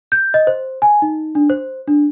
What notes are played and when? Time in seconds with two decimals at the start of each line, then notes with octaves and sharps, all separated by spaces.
0.12 G6
0.34 D#5
0.47 C5
0.82 G#5
1.02 D#4
1.35 D4
1.50 C5
1.88 D4